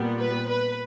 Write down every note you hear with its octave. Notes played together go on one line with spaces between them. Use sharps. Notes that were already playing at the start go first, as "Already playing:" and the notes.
Already playing: A#2 G3 B3
B4
B4